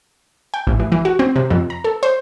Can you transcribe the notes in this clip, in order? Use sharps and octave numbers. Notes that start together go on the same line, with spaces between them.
G5
A1
E3
E3
F#4
C4
C3
F2
A#5
A4
C5